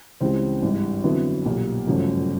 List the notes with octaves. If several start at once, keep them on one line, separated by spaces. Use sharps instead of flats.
C#2 C#3 E3 G3 C4
G#1 G2 E3
F2 D3 F#3 B3 E4
B1 A#2 G3
G1 F#2 C#3 F3 A3